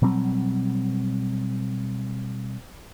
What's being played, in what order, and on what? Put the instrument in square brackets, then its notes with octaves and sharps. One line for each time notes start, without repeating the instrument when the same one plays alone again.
[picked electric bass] B2 F#3 G3 C4